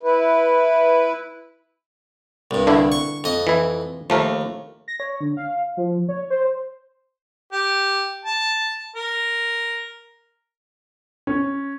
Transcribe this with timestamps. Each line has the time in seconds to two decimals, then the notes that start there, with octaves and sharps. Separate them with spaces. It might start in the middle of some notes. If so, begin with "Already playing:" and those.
0.03 E4 B4
2.51 C2 G2
2.67 D3 D4 E4
2.92 C#6
3.24 F2 D#5
3.47 E3 E4
4.10 D#2 F3 A3 A#4
4.88 A#6
5.00 C#5
5.20 D3
5.37 F5
5.77 F3
6.09 C#5
6.30 C5
7.53 G4
8.25 A5
8.96 A#4
11.27 C#4